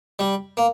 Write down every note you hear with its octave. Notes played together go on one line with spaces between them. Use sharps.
G3
A#3